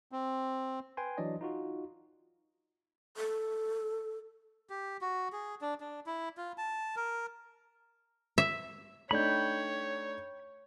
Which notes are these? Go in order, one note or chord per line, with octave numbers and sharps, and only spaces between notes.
C4
B4 G5 G#5 C6
E3 F#3 D4 D5 D#5
D#4 F4 F#4
A4
G4
F#4
G#4
D4
D4
E4
F4
A5
A#4
E5
A3 D4 D#4 C#5 G5 B5